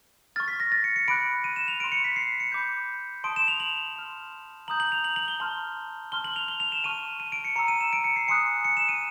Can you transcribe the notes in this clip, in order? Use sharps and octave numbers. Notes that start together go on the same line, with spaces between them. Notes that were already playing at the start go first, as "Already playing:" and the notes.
C#6 F6 A6
B6
A#6
A6
C#7
C#7
B5 D6 F#6 D7
D#7
E7
F7
C6 F6 D7
C#7
B6
C7
C#7
B5 D6 G6
A5 C6 D#6 D7
E7
F7
F#7
C6 F6
A#5 D#6 G6 F#7
F#7
F7
F#7
F#7
G7
A5 C6 F6 F#7
A5 C6 F6 G7
F#7
F7
G7
F7
E7
A5 C#6 F6 D#7
D#7
D7
C#7
A#5 C#6 E6 C#7
D#7
E7
D7
C#7
C7
G#5 C6 D#6 F#6 C#7
C#7
E7
D#7